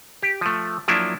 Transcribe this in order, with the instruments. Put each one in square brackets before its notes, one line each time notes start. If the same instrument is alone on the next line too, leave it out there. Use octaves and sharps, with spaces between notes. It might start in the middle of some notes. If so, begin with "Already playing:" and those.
[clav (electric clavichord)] G4
F3 A3
F3 F#3 A#3 D4 E4